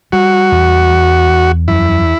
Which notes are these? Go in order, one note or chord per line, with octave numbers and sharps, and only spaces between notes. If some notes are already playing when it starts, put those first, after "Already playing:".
G3 F#4
E2
E2
E2
F#2 E4